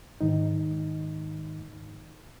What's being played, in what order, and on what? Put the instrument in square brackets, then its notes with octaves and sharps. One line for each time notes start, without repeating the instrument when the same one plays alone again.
[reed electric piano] G#2 D#3 D#4